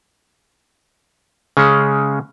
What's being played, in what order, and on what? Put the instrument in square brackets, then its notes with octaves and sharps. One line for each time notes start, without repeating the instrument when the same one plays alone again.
[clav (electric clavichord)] C#3 G#3 C#4